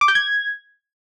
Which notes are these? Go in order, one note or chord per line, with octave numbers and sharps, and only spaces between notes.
D6
G6
G#6